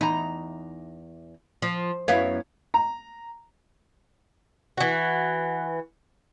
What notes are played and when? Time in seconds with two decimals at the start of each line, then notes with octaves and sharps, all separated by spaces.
0.01 E2 D#4 A#5
1.62 F3
2.08 F#2 B3 E4 C#5 F5
2.74 A#5
4.77 E3 F#4